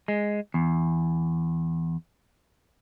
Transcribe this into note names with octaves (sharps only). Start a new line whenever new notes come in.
G#3
E2